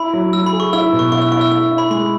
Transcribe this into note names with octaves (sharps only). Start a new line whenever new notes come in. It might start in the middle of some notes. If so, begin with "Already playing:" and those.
Already playing: E4 B5
F#3
F#3 E6
B5
G#4
C#6
E4 E6
B2
C#6
E4 C#6
E6
E4 C#6
E6
E4 E6
E4
B5
G#3 B5